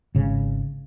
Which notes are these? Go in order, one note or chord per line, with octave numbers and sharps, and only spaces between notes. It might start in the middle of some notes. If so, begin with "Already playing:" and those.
G#1 C#3